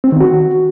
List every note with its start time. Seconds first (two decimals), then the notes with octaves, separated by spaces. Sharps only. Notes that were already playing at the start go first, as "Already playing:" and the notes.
0.04 C4
0.12 D#3
0.21 F#4